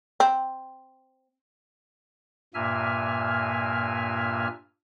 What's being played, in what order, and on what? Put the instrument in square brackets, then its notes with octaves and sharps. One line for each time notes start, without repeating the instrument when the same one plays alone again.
[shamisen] C4
[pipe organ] G2 A#2 A#3 E5 G#5 F6